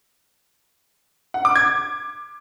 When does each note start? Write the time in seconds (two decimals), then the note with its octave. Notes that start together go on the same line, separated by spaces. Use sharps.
1.34 F#5
1.45 D6
1.56 G#6